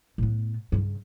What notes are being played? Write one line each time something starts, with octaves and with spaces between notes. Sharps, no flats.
A2 B3
G2 C#3